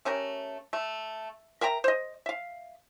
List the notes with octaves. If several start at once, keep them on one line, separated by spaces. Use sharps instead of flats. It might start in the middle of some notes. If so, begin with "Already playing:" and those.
A3 C#4 G4 A#4
A3
A#4 E5 G5 A#5
C5 D#5
E5 F5